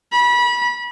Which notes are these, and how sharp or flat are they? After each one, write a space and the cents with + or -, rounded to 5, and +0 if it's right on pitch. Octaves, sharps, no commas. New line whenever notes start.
B5 -30